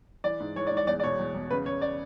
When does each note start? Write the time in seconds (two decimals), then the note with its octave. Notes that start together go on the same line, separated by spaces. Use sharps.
0.24 E3 D5
0.40 G#2
0.56 E3 C#5
0.67 D5
0.72 G#2
0.77 D5
0.87 E2 D5
1.00 D5
1.03 B2 C#5
1.19 E2
1.35 E2
1.51 C#3 B4
1.66 C#3 C#5
1.82 D5